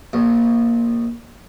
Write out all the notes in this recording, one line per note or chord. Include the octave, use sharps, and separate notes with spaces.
A#1